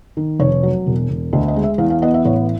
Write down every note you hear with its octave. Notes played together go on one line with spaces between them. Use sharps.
D#3
F1 C#5
F#3
E1
E1
D2 D#5
D#5
G#3
E5
E2 F5
F5
B3 D#5
E5
A1 C#5